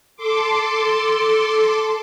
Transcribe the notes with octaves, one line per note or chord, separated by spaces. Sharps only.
A4 C6 D6